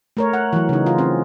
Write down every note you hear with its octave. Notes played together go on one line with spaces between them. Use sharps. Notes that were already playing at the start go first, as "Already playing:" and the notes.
A3 A#4 C#5
F#5
E3 F#3
C#3 D#4
F4
C4 C#4